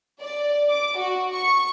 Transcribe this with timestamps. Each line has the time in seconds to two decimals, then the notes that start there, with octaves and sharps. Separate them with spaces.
0.22 D5
0.70 D6
0.99 F#4
1.34 C#6